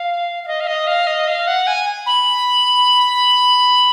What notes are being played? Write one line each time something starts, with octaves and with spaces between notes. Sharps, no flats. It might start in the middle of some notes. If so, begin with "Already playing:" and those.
Already playing: F5
F5
D#5
F5
D#5
F5
D#5
F5
F#5
G#5
B5